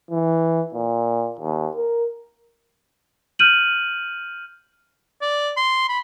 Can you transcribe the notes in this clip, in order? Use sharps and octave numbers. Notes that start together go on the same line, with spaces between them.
E3
A#2
D#2
A#4
F6 G6 D#7 F#7
D5
C6
B5